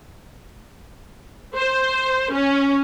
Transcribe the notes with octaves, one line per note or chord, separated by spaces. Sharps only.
C5
C#4